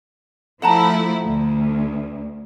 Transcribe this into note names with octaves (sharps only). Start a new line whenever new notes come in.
F3 A3 E4 F#5 A5 A#5
D2